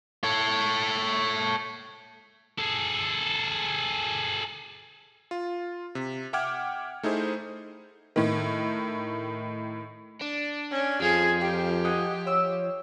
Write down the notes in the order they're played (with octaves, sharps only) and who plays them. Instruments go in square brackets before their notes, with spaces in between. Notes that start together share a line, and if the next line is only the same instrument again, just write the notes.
[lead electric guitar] A4 C#5
[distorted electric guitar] G#4 A4
[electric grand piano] F4
C3
E5 F#5 G5 D6 F6 G#6
A3 D#4 E4 G#4 C5
[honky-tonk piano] A2 D#3
[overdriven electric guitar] D4
[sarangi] C#4
[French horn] F2 [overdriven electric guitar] F3 [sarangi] G#4
[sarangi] G4 [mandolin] G5
[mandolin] D#5 F#5 G#5
[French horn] C#5 [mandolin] E6